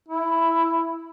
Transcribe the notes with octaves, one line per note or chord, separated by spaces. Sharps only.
E4